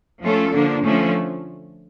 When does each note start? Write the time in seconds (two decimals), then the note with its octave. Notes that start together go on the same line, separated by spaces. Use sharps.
0.23 F3 A3 C#4 F4 A4
0.53 D3 F3 A#3 D4
0.84 D3 F3 A3 C#4